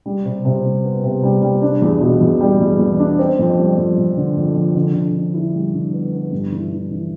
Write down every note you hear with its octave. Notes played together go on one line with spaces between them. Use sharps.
G3
C3
C3
G3
B3
C3
G3
G3
D4
E2
B2
E2
G3
E2
E2
D4
C4
F2
G3
F2
F2
D3
F2
F2
D3
D3
D3
E4
G3
D3
B3
B3
G2
E3
E3
E3